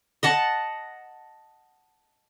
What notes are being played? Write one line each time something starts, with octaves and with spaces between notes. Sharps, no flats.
D#5 F#5 A5